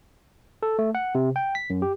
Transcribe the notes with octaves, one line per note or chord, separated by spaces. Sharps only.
A4
A3
F#5
C3
G5
B6
F#2
G4